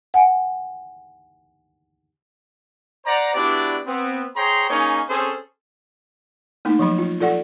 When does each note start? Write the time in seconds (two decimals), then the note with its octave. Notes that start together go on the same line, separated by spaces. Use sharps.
0.14 F#5 G#5
3.06 C5 D5 F#5 A#5
3.35 B3 D4 E4 F#4 G4 D5
3.86 B3 C4
4.36 G#4 C5 C#5 G5 A#5 C6
4.70 A#3 C#4 D#4 G#4 C#5
5.09 C4 C#4 G#4 A4 C5
6.65 A3 A#3 D#4
6.79 F3 F#3 B5
6.98 F4
7.21 F4 A4 D5 F#5